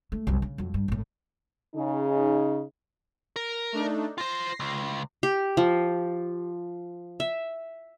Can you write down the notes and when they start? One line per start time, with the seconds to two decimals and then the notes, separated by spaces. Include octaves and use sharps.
0.12 A3
0.27 C2 F#2
0.42 C#3
0.58 F2 F#3
0.74 G2
0.88 G#1 A2
1.75 C#3 D#4
3.36 A#4
3.73 A3 D4 D#4
4.18 F4 C5 A#6 C7
4.60 C#2
5.23 G4
5.57 F3
7.20 E5